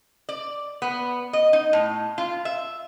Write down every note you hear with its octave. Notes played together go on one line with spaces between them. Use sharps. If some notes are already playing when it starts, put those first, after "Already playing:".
D5
B3
D#5
D#4
A2
F4
E5